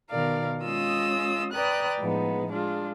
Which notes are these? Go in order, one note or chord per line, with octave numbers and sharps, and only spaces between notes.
B2 D#3 A#4 D5 F5
G#3 C#4 F4 D#5 D#6 E6
B4 D5 G5 A#5 D#6 F#6
A2 F3 G#3 B3 D#4
G#3 D4 F4